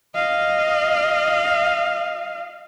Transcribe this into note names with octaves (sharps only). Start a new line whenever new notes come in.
D#5 F5